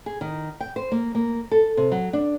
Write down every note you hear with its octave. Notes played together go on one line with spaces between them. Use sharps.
G#4
D#3
G5
C5
A#3
A#3
A4
C3
F#3
D4